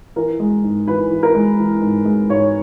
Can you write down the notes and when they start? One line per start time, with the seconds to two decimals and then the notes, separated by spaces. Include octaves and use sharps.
0.16 E3 A#4
0.40 G#3
0.64 G#2
0.87 E3 B4
1.11 E3
1.23 A#4
1.34 G#3
1.59 E3
1.82 G#2
2.05 G#3
2.30 G#2 C#5